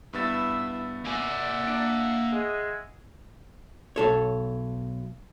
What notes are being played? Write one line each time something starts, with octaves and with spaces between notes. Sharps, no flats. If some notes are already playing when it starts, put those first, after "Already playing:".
G2 B3 E4 E5 A6
A#3 D5 E5 F#5 G#5
D4 D7
G#3 G#4 D#5
B1 A4 C#5